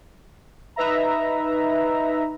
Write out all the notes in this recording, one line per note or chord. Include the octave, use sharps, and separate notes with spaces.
D#4 B4 E5 A#5